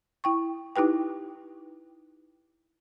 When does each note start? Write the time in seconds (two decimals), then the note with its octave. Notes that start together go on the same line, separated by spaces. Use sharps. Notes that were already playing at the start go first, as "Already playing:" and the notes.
0.24 E4 G5 C#6
0.76 D#4 E4 G4 B4 G5